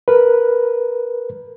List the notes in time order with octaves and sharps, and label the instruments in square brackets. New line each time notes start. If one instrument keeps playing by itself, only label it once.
[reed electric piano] A#4 B4